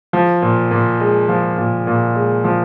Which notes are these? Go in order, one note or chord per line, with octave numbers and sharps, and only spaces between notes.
F3
A#2
A#2
G#3
F3
A#2
A#2
G#3
F3